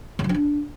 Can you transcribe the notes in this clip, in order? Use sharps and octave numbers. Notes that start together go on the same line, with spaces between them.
C#3
F#3
C#4
D4